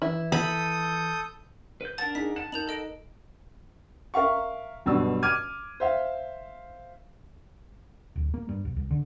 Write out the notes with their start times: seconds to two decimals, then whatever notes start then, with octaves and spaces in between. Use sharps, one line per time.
0.02 E3 E4
0.32 A4 B5 D#6 G6
1.81 B4 G6
1.98 D4 A#4 F#5 A5 A6
2.15 D#4 G#4 B6
2.36 F#5 A5 E7
2.52 D#4 A#4 G6 F7 F#7
2.68 A4 D#5 D7
4.14 A#4 E5 F5 C#6
4.86 B1 G2 B2 E6
5.23 D6 F6 G#6 D#7
5.80 C5 E5 F5
8.16 D1
8.34 A#3
8.49 G2
8.65 B1
8.77 C2
8.91 D3